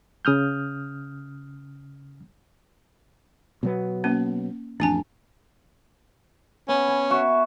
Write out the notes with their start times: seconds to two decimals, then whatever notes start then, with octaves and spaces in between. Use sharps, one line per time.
0.25 C#3 D#6 F6 G6
3.63 B2 F#3 B3
4.04 A#3 C#4
4.80 A1 F2 D4 G#5 A5
6.69 B3 C#4
6.88 G#5
7.11 F#4 E5